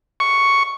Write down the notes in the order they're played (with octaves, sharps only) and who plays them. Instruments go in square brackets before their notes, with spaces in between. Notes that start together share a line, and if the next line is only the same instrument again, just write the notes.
[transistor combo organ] C#6